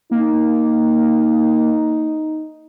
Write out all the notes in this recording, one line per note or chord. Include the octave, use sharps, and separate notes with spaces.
A#3 D#4